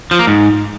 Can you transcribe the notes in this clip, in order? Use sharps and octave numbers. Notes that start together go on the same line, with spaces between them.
F3
A#3
G#2